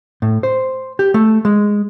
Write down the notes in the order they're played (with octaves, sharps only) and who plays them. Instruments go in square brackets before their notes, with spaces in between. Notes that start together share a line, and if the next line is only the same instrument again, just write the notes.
[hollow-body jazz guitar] A2
C5
G4
A3
G#3